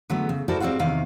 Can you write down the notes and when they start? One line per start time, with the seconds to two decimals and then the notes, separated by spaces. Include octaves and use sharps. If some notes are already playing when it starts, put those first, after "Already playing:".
0.10 D3 F#3 A3 B3
0.29 C#3
0.48 E4 F#4 A4 A#4 C5 D5
0.60 G3 C4 F#4 F5 F#5
0.79 E2 C3 D#3 F5